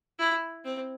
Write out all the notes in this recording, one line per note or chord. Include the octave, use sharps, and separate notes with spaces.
E4
C4